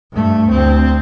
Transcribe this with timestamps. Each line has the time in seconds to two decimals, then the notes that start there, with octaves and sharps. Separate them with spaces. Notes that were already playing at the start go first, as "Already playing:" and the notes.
0.13 G2 A3
0.50 D2 C4